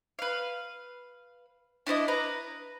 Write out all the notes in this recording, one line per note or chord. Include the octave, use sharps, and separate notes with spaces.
B4 F5
D4 E4 C5 D#5
B4 A#5